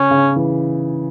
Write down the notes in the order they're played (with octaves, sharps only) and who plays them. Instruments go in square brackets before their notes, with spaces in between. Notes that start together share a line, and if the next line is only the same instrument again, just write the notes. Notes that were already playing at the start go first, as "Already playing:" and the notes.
Already playing: [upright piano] C#3 [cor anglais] C#4
[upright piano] C#3
E3